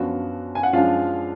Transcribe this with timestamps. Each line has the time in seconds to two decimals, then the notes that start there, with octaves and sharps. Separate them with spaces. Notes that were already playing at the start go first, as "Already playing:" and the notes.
Already playing: F#2 F3 B3 D4 F#4
0.55 G#5
0.63 F#5
0.73 F#2 F3 G#3 D4 F4 F5